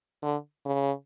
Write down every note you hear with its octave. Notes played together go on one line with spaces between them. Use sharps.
D3
C#3